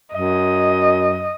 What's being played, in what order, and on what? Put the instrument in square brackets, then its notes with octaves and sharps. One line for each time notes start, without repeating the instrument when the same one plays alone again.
[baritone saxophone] F#2 [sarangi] D#5